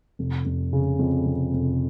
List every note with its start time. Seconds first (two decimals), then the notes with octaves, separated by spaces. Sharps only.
0.19 F1
0.46 F1
0.73 C#3
0.99 F2
1.25 F1
1.53 F1